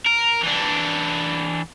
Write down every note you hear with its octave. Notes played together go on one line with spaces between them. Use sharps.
A#4
E3 D4